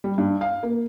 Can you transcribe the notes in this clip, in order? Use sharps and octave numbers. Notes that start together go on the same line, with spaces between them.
G3
G2
F5
A#3